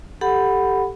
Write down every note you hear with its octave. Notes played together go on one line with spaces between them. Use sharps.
G4 A4 F#5 B5